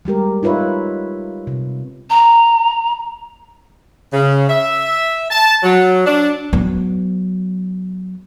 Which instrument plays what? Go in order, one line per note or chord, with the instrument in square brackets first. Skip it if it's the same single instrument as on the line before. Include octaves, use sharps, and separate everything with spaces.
[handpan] G3 G#3 G4 A#4
D#4 F4 B4 C#5 E5
C3
[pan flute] A#5
[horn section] C#3
E5
A5
F#3
D4
[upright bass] F#3 B3